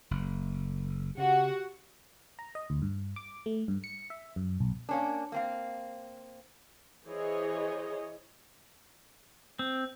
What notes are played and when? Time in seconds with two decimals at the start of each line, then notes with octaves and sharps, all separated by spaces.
0.11 F#1
1.18 C#3 F#4 G4 F#5
2.39 A#5
2.55 D#5
2.70 D2
2.82 G2
3.16 D6
3.46 A3
3.68 G2
3.84 C#7
4.10 E5
4.36 F#2
4.60 B1
4.89 A#3 C#4 D4
5.32 A#3 C4 F5
7.08 E3 G#4 C5 C#5 D#5
9.59 C4